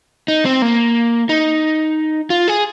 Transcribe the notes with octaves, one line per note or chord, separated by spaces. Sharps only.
D#4
C4
A#3
D#4
F4
G#4